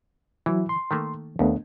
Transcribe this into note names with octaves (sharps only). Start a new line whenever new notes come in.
E3 F#3 E4
C6
D#3 A3 A#3
D#2 A3 B3 D4